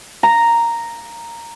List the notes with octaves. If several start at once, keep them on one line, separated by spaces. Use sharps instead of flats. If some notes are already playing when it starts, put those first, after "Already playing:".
A#5